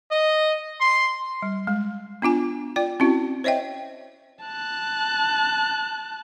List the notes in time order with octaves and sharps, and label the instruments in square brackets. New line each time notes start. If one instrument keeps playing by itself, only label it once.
[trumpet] D#5
C6
[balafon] G3
G#3
B3 D4 F4 G#5
F4 D5 G5
C4 C#4 E4 F#4
C5 C#5 D#5 E5 G5
[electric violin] A5 F#6